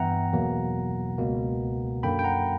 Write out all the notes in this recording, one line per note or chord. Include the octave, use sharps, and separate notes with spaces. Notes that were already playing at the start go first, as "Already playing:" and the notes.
Already playing: G2 E3 B3 E5 F#5 G5 A#5
E2 B2 F#3 A#3
C#2 B2 A#3
F#2 D3 F#3 A#3 G5 B5
G5
F#5 A#5